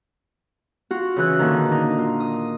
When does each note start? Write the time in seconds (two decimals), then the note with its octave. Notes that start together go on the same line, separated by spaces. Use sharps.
0.91 F4 F#4
1.16 C#3 E3 F#6
1.39 A#2 D3 D#3
1.69 D4 D#4
1.99 F4
2.20 D#6